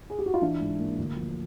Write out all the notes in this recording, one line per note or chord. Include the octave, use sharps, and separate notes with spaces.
G#4
G4
F#4
F4
E3 D4 E4
G#2
A#3
D2
F3